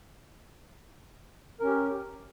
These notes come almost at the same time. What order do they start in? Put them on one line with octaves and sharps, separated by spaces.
A#4 C#4 G4